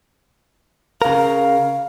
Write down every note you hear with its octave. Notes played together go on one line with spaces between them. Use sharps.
C#3 A#4 F5